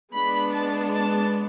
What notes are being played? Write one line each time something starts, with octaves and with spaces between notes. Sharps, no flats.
G#3 B3 D4 B5
A5
A5